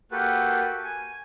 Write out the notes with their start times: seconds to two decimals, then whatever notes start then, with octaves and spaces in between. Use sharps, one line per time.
0.12 A#3 F#4 G4 A4 B4
0.85 G#5